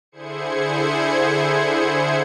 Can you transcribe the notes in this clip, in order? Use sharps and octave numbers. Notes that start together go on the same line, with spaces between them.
D3 E4 G#4 C5 G#6 C#7